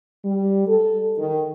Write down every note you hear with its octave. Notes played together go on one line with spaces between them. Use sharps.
G3
A4
D#3